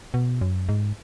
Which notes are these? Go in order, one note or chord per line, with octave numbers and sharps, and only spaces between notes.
B2
F#2
G#2